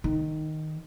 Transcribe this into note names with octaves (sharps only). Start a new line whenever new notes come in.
D#3